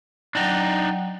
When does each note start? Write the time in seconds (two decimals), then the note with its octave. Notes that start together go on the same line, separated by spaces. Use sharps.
0.35 F#3 D4 D#4 G5